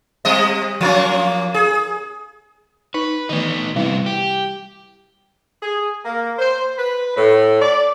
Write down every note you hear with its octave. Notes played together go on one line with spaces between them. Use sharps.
G3 C4 D#5
F3 A#3 C#4
G#4
D#4 B4
D#3 E3 A3 B3 D#4
C3 G3 B3 E4
G4
G#4
A#3
C5
B4
A2
D5